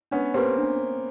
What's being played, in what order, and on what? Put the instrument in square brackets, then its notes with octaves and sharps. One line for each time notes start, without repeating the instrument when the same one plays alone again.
[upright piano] B3 C#4 [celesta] D4
[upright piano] A#3 C4 [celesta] G4 B4
[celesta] D4